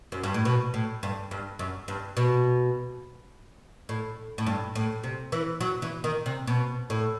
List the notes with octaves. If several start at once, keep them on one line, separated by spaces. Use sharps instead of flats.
F#2
G2
A2
B2
A2
G2
G2
F#2
G2
B2
A2
A2
G2
A2
C3
E3
F#3
E3
D#3
C3
B2
A2